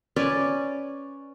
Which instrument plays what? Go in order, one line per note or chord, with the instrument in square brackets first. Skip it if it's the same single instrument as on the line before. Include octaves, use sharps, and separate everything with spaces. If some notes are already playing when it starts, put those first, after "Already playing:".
[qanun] C#4 B4 D5